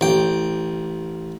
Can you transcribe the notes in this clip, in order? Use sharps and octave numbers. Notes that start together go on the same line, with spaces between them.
A1 G5